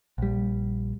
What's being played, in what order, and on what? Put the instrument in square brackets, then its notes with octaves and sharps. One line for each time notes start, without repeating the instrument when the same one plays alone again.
[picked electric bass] A#1 G3